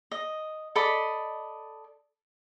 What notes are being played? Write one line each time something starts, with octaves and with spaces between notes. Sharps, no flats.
D#5
A4 D5 D#5 B5